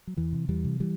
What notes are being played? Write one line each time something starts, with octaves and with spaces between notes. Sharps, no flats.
F#3
E2 E3
C3
E2 E3 G3
C3
E3 G3